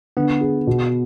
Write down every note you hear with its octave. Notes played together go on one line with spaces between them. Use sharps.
D3 B3
G#4
B2